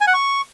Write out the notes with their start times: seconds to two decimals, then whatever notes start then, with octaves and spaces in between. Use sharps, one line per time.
0.01 G#5
0.07 F#5
0.14 C#6